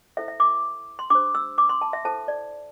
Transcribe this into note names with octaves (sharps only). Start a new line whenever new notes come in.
E4 A4 C5 E5
E5
D6
C6
D4 G4 C5 D6
E6
D6
C6
A5
E5
E4 A4 C5 A5
D5